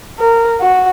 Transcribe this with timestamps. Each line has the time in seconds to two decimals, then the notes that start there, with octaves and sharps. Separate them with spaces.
0.19 A#4
0.61 F#4